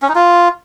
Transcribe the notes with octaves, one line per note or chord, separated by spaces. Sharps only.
C#4
D#4
F4